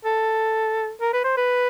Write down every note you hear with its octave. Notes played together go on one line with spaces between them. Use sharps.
A4
A#4
B4
C5
B4